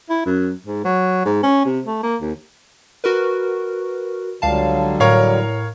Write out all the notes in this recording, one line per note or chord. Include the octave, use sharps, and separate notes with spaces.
E4
F#2
G#2
F#3
G#2
C#4
C3
A3
A#3
D#2
F#4 A#4 B4
C#2 D3 F#3 G3 F5 A5
A2 A#4 C#5 F5